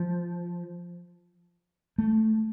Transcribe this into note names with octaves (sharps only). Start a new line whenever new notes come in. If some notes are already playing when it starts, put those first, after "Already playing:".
Already playing: F3
A3